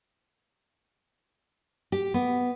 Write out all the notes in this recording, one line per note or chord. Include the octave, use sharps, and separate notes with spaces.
G4
B3